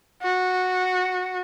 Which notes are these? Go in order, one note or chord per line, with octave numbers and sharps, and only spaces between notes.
F#4